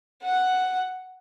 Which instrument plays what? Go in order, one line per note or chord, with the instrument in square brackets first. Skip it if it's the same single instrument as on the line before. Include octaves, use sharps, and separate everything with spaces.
[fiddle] F#5